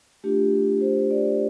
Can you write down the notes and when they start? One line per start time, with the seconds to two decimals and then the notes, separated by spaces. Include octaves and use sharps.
0.24 A3 D4 F4 G4
0.81 C5
1.11 D5